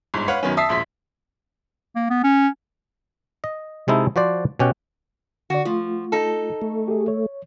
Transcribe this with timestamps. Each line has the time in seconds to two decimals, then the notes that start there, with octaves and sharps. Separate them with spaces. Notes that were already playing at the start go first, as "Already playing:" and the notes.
0.14 G1 G#2
0.28 B4 C#5 F5 F#5
0.43 F#2 D#3 B3 C#4
0.57 E5 A5 D#6 E6 B6 C7
0.69 E1 A#1 E5 C6 B6
1.96 A#3
2.10 B3
2.24 C#4
3.44 D#5
3.88 C3 G#3 D#4 E4 A4
4.16 F3 F#4 C5 D5
4.59 B2 C#4 G4 F#5
5.50 D3 F#4 D5
5.65 F3 A3 F4
6.12 D#4 A4
6.62 A3
6.88 G4 G#4
7.08 C#5